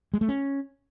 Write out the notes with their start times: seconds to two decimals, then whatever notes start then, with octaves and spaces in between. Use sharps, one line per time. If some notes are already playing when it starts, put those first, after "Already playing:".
0.14 G#3
0.21 A3
0.29 C#4